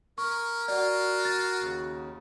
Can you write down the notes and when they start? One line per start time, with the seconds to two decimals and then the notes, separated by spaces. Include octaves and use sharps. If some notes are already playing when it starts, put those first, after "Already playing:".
0.18 C#4 A#4 C#6
0.68 F4 F#4 D5
1.25 A6
1.61 D#2 C#3